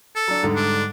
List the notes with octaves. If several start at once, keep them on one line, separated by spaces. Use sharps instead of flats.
A4
F#3 D4
G#2 D3 G3
D4